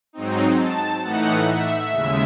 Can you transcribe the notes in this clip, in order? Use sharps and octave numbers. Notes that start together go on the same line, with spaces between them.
G#2 F#3 C4 D#4
A5
A2 E3 A3 D#4 F#5
E5
D#2 C#3 G#3 E5